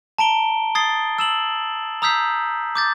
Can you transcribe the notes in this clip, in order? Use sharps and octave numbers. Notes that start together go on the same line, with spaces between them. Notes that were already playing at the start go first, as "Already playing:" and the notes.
A5 A#5 D7 G7
D#6 G#6 A6 C7 G7
E6 E7 F#7
A#5 D#6 E6 G6 B6 C7
D6 G6 A6